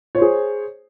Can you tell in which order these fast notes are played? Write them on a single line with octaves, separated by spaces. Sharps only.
C#5 C5 G#4